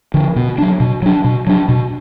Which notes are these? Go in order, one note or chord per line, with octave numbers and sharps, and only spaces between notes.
D3 F3
B2
F#3 D4
B2
F#3 D4
B2
F#3 D4
B2